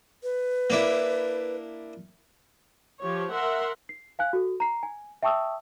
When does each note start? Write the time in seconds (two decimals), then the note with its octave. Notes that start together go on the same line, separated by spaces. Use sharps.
0.23 B4
0.70 A#3 D4 E4
3.01 F3 G4 C#5
3.32 A#4 E5 F#5 C6
3.89 C7
4.19 F5 G#5 F#6
4.33 F#4 A4
4.60 A#5 C7
4.83 G#5
5.23 E5 G5 A5 C#6 D#6 E6